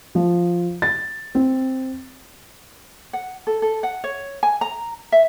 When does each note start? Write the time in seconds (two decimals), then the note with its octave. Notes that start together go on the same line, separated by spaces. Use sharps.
0.15 F3
0.82 A6
1.35 C4
3.13 F#5
3.47 A4
3.62 A4
3.83 F#5
4.04 C#5
4.43 G#5
4.61 A#5
5.12 E5